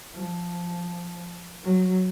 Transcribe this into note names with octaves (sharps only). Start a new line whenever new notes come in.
F3
F#3